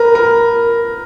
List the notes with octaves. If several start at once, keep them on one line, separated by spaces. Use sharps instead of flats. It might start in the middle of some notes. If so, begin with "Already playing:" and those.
Already playing: A#4 B4
A#4